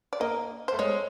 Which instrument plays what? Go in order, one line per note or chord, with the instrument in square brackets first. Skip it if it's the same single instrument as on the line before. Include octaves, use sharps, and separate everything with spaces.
[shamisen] D5
[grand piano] A#3 [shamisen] D#5
[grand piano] A3 [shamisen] C5
[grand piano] G#3 [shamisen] C#5